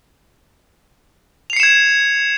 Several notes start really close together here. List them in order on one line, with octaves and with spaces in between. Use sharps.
F7 C7 C#7 E7 G#6